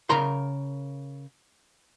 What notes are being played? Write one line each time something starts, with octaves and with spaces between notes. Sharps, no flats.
C#3 A#4 A#5 C6